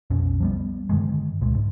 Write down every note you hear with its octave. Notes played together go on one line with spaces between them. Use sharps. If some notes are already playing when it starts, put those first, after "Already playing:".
B1 F2 B2 C#4
F3 G3 B3
G2 D3 D#3 G#3
C#2 A#2 G#3
G#2